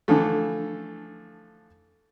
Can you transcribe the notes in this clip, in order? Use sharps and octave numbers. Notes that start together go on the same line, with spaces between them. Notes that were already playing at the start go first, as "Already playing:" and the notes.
D3 E3 F3 A3